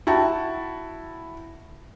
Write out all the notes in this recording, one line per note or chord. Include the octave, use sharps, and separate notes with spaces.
E4 F#4 G5 A5